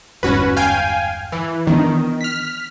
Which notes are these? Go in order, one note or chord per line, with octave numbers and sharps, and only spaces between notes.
G1 E2 G#2 C#4 F#4 B4
F5 G5 G#5
E3
D#3 E3 B3 D4
F6 B6